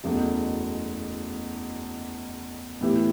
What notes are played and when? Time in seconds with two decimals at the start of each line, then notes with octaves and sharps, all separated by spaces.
0.04 F#1 E2 B2 A3
2.81 A2 E3 B3 E4 G4